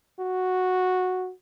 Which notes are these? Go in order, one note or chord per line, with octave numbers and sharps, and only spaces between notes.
F#4